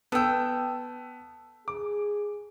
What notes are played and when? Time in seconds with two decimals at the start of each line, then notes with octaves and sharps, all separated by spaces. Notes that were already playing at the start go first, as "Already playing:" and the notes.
0.12 B3 A4 G5 E6
1.68 G#4 D6